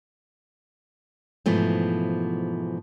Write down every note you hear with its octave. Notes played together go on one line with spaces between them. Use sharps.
G#2 B2 E3 F3 A3